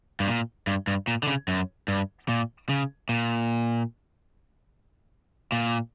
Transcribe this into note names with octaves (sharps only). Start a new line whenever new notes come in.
G2
A#2
G2
G2
A#2
D3
C#3
F#2
G2
A#2
C#3
A#2
A#2